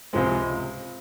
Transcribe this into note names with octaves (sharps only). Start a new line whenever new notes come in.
C#2 C3 F3 G#3 C4